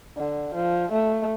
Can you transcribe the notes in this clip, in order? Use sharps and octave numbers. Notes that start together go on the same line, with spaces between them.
D3
F3
A3